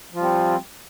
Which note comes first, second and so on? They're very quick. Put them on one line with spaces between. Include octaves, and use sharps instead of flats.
F3 F4 G3 C4